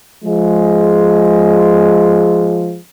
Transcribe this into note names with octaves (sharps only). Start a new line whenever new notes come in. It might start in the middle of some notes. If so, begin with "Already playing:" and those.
F3 G#3